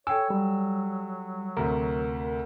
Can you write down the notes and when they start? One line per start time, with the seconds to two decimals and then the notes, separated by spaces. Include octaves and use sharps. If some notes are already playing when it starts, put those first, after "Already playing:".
0.07 A4 C#5 G5 G#5 E6
0.30 F#3 G3
1.57 D2 C3 A#4